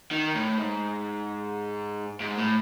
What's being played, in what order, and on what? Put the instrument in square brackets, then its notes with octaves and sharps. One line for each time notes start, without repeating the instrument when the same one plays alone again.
[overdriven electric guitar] D#3
A2
G#2
G#2
A2